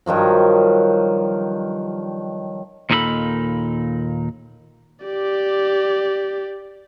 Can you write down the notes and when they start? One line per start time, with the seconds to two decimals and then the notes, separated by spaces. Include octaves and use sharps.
0.06 G2 D#3 F3 F#3
2.90 D#2 A#2 D#4 G#4 A4 B5
5.05 G4 D5